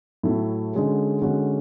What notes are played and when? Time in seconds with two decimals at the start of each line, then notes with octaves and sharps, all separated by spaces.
0.23 A2 F#3 A3 E4
0.72 D3 G#3 C#4 F#4
1.22 D3 G#3 C#4 F#4